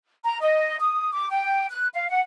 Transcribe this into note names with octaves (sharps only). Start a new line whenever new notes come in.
A#5
D#5
D#6
D6
G5
F#6
F5
F#5